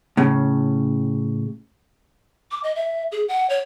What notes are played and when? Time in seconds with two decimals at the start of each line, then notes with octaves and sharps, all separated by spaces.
0.17 A2 C#3
2.51 D6
2.63 D#5
2.76 E5
3.12 G#4
3.28 F#5
3.50 C#5